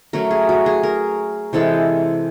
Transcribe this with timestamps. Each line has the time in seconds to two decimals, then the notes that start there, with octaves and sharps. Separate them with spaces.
0.13 F#3 A3 C#4 A#4
0.31 G#4
0.49 F#4
0.66 G#4
0.83 A#4
1.53 C3 E3 G#3 A4